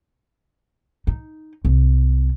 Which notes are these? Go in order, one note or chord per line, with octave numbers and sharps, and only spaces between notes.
D#4
C2